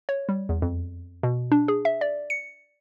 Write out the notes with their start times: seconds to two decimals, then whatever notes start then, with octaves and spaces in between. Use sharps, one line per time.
0.09 C#5
0.29 G3
0.49 E2
0.62 F2
1.23 B2
1.52 D4
1.68 G#4
1.85 E5
2.01 D5
2.30 C#7